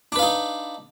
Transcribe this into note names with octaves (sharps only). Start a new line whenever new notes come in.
D4 D#4 B4 F5